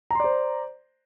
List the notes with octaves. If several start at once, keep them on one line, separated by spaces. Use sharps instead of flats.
C5 D5 A#5 C6